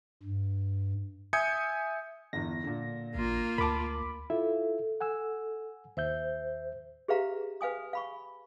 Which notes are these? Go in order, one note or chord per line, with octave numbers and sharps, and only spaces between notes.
G2
E5 G#5 D#6 G6 G#6 C#7
G1 E2 A#6
A#2 D3
A1 A#3 F4
D2 A#4 A5 B5 D6
E4 F4 A4 E5
F#5 G#5 E6
D#2 C5 E5 G6
G4 G#4 B4 E5 F5 A#5
B4 F5 G#5 D#6
F5 B5 C#6